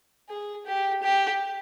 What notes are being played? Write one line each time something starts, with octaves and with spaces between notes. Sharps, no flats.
G#4
G4
G4